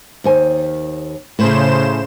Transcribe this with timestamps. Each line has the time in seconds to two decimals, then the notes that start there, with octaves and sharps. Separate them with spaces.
0.24 D#2 C5 G#5
1.39 A2 C#3 C5 E7